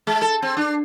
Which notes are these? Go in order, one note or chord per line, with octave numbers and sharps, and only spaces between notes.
G#3
A4
C4
D4